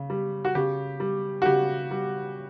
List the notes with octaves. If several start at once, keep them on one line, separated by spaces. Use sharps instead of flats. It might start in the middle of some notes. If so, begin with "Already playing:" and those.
Already playing: C#3
G3
F#4
C#3 G4
G3
F#4
C#3 G4
G3